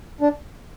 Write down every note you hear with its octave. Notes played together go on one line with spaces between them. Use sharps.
D4